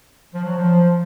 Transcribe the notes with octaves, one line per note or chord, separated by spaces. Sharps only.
F3
F#3
F3